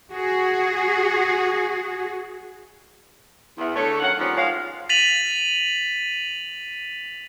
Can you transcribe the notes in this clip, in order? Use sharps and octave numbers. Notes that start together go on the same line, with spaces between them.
F#4 G#4
E2
D3 A3 A4 C#5
F#2 D#3 F5 F#5
D#3 F3 G3 A#3 B3 C#4
F3 G#3 F#4 C#5 F5
A6 B6 D#7 F7 F#7